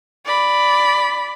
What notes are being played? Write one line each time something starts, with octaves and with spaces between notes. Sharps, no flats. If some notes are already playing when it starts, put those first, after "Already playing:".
D5 B5